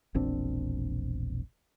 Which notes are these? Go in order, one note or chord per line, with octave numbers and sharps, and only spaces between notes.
E1 A#1 C4 D4